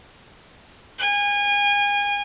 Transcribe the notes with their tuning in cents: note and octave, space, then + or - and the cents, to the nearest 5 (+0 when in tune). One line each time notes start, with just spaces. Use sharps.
G#5 -30